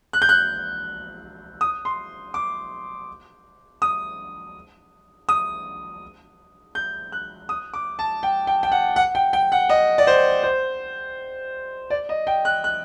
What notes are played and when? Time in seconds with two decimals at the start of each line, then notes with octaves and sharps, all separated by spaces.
0.13 F#6
0.22 G6
0.29 F#6
1.61 D#6
1.85 C6
2.34 D6
3.82 D#6
5.29 D#6
6.75 G6
7.12 F#6
7.49 D#6
7.74 D6
7.99 A5
8.23 G5
8.47 G5
8.63 G5
8.72 F#5
8.96 F#5
9.15 G5
9.33 G5
9.52 F#5
9.69 D#5
9.98 D5
10.07 C5
10.43 C5
11.90 D5
12.09 D#5
12.27 G5
12.45 F#6
12.64 F#6